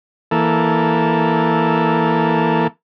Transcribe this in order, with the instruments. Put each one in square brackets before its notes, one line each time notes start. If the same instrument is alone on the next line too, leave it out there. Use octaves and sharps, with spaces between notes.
[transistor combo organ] E3 A#3 A4